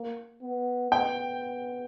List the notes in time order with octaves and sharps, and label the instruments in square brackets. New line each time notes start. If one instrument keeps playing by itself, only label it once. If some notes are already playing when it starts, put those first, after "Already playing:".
Already playing: [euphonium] A#3
B3
[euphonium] B3 [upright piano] G5